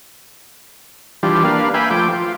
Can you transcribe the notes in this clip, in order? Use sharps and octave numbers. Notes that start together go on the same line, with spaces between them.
E3 G3 D4 F4 G4
A#3 D4 B4 F5
B4 E5 F5 G5 G#5 B5
F3 A3 G5 D6
F4